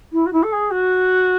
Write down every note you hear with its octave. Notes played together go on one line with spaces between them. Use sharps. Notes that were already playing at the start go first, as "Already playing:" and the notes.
E4
F#4
E4
A4
G#4
F#4